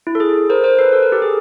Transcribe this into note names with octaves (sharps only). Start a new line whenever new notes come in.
E4
A4
G#4
A#4 C5
A#4 C5
A4 B4
A4
A#4
G4 A4
G#4